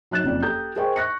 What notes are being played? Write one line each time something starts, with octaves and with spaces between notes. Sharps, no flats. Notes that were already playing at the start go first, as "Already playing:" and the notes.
F#3 D#4 F#6 A6 E7
F#1 F2 D5
G4 A4 A#5 D#6 G6
G#4 A#4 C5 D#5 G5 C#6
C#6 F#6 A#6 C#7